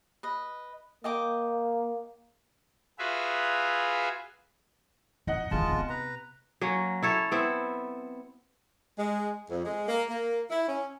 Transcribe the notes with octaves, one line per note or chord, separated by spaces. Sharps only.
B4 D#5
A#3 D#5 G5 D6
F4 F#4 G#4 B4 E5 F5
F2 D#4 D#5 F#5
D#2 E3 G#3 F4 A5
C3 B3
B4 A#5
F#3 A#3 C#4
E4 A4 C#5
B3 C4 E4
G#3
F2
G#3
A#3
A#3
E4
C#4